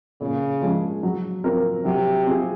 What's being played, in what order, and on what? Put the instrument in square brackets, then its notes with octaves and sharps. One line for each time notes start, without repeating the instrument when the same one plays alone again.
[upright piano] A#2 [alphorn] C#3
[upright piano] F3 G#3 C#4 G#4
F#3
C4 F4 A#4
[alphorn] C3 [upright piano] F#3
[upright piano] C4 F4 G#4